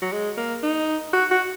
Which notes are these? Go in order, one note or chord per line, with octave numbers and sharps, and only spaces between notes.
F#3
G#3
A#3
D#4
F#4
F#4